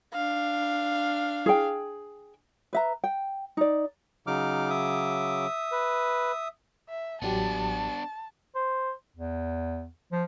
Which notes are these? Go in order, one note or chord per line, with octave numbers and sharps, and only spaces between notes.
D4 F5
G#4 G5
B4 E5 A#5
G5
D#4 D5
C#3 F#3 D#4 D6 F6
E5 D#6
B4
E5
A1 F#3 B3 D4 G4 A5
C5
E2
F3